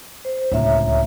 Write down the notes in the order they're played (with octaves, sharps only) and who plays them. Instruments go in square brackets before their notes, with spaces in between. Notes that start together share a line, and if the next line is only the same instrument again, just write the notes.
[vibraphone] C5
[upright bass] D1 C#2 [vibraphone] C#5 E5 A#5